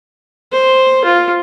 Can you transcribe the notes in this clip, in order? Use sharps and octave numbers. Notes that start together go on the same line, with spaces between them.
C5
F4